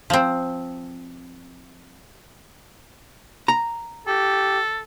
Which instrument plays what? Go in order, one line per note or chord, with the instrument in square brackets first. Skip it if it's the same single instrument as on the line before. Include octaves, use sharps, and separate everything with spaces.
[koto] F3 C4
[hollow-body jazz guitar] A#5
[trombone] G4 [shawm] A4